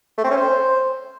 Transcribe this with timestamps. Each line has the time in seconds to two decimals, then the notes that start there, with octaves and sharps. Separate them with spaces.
0.18 A3
0.24 C4
0.31 C#4
0.37 C5